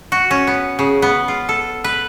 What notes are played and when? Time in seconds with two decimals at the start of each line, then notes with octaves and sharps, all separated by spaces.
0.12 F#4
0.31 C#4
0.47 B3
0.79 C#3
1.02 B3
1.28 F4
1.49 A4
1.84 B4